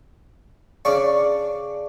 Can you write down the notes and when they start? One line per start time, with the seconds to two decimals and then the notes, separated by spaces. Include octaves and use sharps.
0.85 C#3 D4 C#6